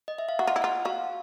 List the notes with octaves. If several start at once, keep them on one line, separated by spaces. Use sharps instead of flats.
D#5
E5
F5
F#4 F#5
F4
E4
F4 F#5
F#4 F5